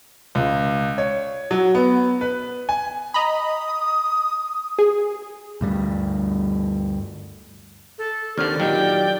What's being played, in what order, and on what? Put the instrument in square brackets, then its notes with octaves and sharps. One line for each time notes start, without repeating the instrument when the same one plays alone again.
[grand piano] C#2
C#5
F#3
B3
B4
G#5
[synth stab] D#5 A#5 B5 [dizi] D#6
[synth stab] G#4
[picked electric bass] D2 G2 G3
[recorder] A4
[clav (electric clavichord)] D#2 D3 [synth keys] D#3 C4 G6 [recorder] D5 [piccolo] F6
[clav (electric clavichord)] A#2 D#3 [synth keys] F#3 G4 [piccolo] G5